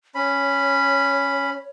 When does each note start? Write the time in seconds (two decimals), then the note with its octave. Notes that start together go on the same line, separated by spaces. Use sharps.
0.15 C#4 C#5 B5